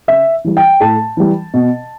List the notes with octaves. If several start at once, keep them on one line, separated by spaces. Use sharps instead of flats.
C#3 E5
E3 G3
G5
A2 A5
E3 G3
B2